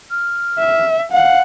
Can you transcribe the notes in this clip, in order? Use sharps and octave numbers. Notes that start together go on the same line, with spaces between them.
F6
E5
F5 F#5